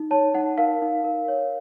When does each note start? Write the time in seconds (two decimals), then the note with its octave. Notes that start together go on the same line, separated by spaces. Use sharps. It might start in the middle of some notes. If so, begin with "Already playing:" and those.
Already playing: D#4
0.11 C#5 A5
0.34 D#4 F#5
0.58 A#4 F5
0.82 D#4
1.04 A#4
1.28 C#5